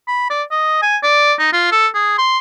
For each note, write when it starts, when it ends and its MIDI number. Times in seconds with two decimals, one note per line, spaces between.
0.08 0.28 83
0.30 0.43 74
0.51 0.80 75
0.82 0.97 80
1.03 1.34 74
1.39 1.52 63
1.53 1.69 65
1.72 1.87 69
1.94 2.14 68
2.18 2.39 84